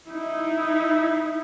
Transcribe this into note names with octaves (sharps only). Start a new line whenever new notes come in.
D#4 E4